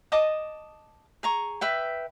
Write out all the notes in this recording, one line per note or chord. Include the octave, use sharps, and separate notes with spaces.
D#5 A5 D6 D#6
G#4 A#5 C#6
B4 E5 G5